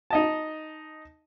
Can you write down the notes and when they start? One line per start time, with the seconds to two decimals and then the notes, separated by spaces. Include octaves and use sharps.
0.10 D#4 D#5 A5